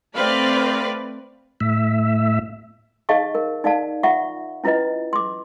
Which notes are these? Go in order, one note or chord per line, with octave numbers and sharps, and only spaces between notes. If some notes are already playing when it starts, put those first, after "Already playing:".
A3 C4 B4 D5 F5 B5
A2 E5
D#4 G#4 D#5 F5 A5 C#6
A#4
D#4 D5 F5 A5
F4 E5 F#5 C#6
C#4 E4 F4 B4 D#5
C6 D6